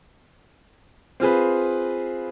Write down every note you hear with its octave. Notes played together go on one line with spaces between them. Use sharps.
C4 F4 G#4 B4